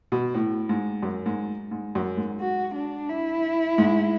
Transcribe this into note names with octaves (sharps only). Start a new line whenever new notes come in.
B2
A2
G#2
F#2
G#2
G#2
F#2
G#2
F#4
D4
E4
G#2